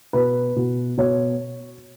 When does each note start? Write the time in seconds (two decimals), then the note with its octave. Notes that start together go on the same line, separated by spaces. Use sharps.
0.13 B2 B4
0.56 B2
0.97 B2 C#5